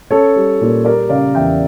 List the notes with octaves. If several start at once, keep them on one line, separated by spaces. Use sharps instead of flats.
C#4 A4 C#5
G3
A#2
G3 A#4 D5
C#3 D5 F5
E2 E5 G5